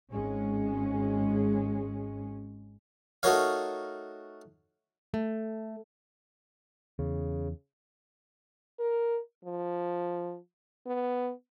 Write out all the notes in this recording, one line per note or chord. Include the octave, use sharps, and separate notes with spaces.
G#1 G#3 C#4
A3 D#4 F#4 A#4 C#5 F5
A3
E2 C#3
A#4
F3
B3